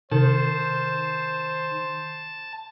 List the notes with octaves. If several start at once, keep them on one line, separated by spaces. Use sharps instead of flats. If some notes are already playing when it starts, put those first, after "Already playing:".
C3 D#3 C5 A5